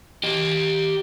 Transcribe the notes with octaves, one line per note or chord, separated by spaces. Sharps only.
G4 D#5